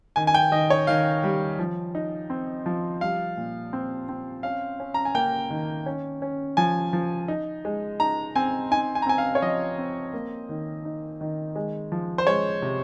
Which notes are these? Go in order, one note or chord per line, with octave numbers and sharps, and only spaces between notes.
D#3 G#5
G#5
G5
D#3 D#5
C#5
D#3 F5
G3
F3
D#4
C4
F3
G3 F5
A#2
C4
C4
C#4 F5
C#4
A#5
G#5
A#3 G5
D#3
C#4
C#4
F3 G#5
F3
D#4
G#3
D#4 A#5
C4 G#5
D#4 G#5
G#5
A#5
C4 G#5
F5
C#5
F3 D#5
C4
A#3
D#3
D#4
D#3
G#3
F3
C5
G#3 C#5
C3